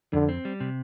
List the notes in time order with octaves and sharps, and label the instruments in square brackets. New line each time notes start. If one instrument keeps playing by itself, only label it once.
[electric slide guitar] F2 [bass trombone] D3
[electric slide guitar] C4
G3
C3